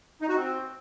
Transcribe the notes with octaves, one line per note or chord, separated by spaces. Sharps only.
D#4
F#4
C4